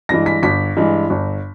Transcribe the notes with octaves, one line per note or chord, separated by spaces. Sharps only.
G2 E3 G#3 A#6
B6
G1 B6
G2 E3 G#3
G1